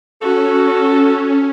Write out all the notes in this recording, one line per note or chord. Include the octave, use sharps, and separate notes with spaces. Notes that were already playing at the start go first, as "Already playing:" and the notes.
C#4 F#4 A4